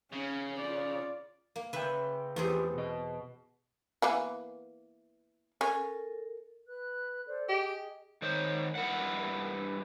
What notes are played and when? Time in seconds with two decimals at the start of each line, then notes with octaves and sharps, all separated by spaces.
0.12 C#3 C#4
0.60 F4 D5
1.56 A#3
1.73 C#3 B4 E5 G5
2.36 E2 A3 C4 G4 G#4
2.74 B2 D#5
4.02 E3 A#3 B3
5.61 C#4 A4 A#4
6.67 B4 F#6
7.25 A4 C5 D5
7.49 G4 G#4 D#5
8.22 D#3 C5 C#5
8.75 G2 E4 A#4 F#5
9.56 D4